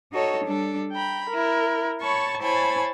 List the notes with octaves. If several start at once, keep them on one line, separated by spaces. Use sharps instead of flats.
D#4 F#4 A4 C#5
G3 D4 A4
G5 A#5 B5
E4 A#4
C#5 A5 B5 C#6
E4 C5 C#5 G#5 A5 B5